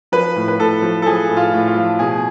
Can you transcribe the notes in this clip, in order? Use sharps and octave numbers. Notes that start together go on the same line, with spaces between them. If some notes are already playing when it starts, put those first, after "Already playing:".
F3 B4
A2
B4
A2 A4
F3
A4
F3 G#4
A2
F4
A2
F4
F3
B2 G#4